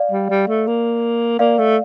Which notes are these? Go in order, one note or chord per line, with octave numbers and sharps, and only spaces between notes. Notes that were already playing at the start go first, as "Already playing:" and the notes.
Already playing: D5 F5
G3
G3
A3
A#3
A#3 D5 F5
A3